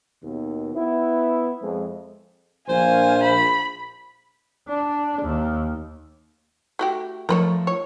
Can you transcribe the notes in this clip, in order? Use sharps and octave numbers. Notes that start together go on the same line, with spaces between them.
D#2 B2
B3 E4
F2 F3 G#3
A#1 C5 F5 G#5
B5
D4
D#2
A3 F#4 G4
F3 A3 A#4 B4 C#5 D#5
C#5